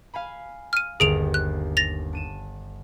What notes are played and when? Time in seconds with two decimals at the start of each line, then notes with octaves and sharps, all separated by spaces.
0.14 F5 G#5 B5
0.73 F6 D#7
1.00 G1 D#2 G#4 D7 F7
1.34 F#6
1.77 A6 A#6 F7
2.13 D4 D#7 E7